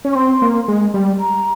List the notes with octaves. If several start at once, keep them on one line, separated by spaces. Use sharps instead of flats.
C#4
C#6
C4 C6
A#3
G#3
G3
A#5